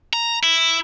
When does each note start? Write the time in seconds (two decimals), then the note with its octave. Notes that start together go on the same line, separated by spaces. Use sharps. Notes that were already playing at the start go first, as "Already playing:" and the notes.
0.13 A#5
0.43 E4